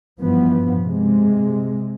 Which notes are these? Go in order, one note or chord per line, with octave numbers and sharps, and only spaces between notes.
G2 E3 F3 B3
C3 G#3